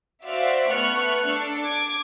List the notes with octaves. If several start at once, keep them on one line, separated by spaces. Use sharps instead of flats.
F#4 C5 D5 E5 F5
A3 B3 C#6 F6 F#6
D4 A4
D6 G#6